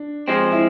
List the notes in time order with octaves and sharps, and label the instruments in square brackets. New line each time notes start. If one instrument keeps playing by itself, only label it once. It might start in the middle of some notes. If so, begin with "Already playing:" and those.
Already playing: [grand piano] D4
[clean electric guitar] F3 G#3 C4
[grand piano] E4